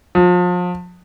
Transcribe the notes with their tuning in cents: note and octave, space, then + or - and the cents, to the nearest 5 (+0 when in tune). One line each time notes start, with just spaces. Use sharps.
F3 +35